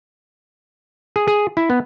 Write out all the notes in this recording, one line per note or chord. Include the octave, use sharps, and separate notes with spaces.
G#4
G#4
E4
B3